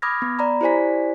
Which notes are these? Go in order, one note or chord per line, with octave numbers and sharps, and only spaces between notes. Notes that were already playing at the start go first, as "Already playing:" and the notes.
B5 D6 D#6 F6 G#6 A#6
B3
D5 A#5 B5
E4 G4 C5 D5 G#5 B6